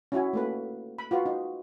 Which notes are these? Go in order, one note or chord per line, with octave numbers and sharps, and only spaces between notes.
C#4 E4 F#4 G#5
A3 A#3 B4
B5
F4 F#4 B4
D#4